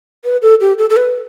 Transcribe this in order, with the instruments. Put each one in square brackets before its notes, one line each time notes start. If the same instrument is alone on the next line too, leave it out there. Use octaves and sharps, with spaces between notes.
[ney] B4
A4
G4
A4
A4
B4